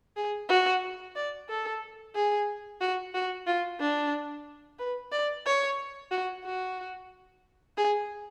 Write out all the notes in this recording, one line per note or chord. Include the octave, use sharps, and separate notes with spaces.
G#4
F#4
D5
A4
G#4
F#4
F#4
F4
D4
B4
D5
C#5
F#4
F#4
G#4